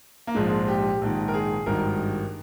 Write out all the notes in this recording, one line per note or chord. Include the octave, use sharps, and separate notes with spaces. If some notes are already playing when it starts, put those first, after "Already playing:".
A#3
A#1 G#2 F3 G#3
G4
A#1 G#2 D#3
A#4
G#4
G#1 G2 D#3 A#4